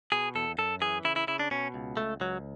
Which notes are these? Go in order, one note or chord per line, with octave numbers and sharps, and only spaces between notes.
B2 G#4
E2 A4
F#2 A4
E3 G#4
C#3 E4
E4
C#3 E4
D4
B2 C#4
C#2
C#2 A3
C#2 F#3